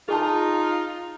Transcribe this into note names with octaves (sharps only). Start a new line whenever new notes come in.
D#4 F4 G#4 G#5 A5